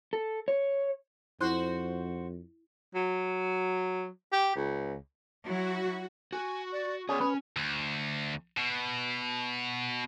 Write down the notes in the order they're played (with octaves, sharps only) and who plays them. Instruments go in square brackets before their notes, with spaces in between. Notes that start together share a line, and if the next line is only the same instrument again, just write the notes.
[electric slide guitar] A4
C#5
[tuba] F2 [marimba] E4 C6 F#6 [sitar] F#4 C5
[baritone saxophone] F#3
G4
C#2
[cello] F#3 E4 [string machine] F#4
[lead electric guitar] F#4 [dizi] G#5
[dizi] D5
[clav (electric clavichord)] C#4 [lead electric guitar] G#4 D5 [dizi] D#6
[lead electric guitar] C#4 [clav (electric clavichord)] B4
[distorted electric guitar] D2
B2